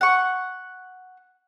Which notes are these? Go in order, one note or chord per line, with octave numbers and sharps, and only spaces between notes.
F#5 C#6